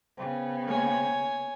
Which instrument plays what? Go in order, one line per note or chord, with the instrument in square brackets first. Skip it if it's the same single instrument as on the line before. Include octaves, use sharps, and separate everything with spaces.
[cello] C#3 B3 [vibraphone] C5 G5
[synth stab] G#3 A#3 [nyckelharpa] C#5 G#5